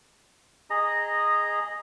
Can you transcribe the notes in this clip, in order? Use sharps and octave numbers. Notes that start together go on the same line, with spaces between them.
G#4 D#5 A#5